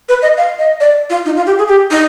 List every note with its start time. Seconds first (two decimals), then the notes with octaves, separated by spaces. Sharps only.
0.09 B4
0.22 D#5
0.37 F5
0.59 D#5
0.80 D5
1.10 F4
1.25 D#4
1.36 F4
1.46 G4
1.58 G#4
1.68 G4
1.91 D#4